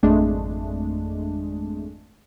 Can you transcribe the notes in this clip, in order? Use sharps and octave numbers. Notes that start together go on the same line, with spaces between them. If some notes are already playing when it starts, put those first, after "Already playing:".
G#1 F2 G#3 A3 D4 G#4